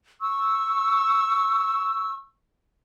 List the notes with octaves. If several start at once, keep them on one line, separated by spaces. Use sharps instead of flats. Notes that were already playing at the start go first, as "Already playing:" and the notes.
C#6 E6